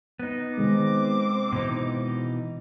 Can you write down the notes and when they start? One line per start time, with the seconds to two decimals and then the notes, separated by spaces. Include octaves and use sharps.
0.19 B3 D#4
0.58 C3 D#3 G#3 C4 D6
1.52 B2 E3 D#4